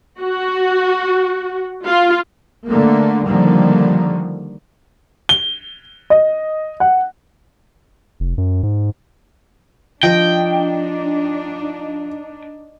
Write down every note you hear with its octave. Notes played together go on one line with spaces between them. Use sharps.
F#4
F4
D3 A3 A#3
D3 D#3 F3 G3 A#3
G7
D#5
F#5
F1
F#2
G#2
F3 D4 D#4 D#5 G5